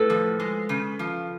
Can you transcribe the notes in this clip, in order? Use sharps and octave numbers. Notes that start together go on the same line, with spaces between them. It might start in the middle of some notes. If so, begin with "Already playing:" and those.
Already playing: A2 A4 B4
F3
G#3
C#3
F3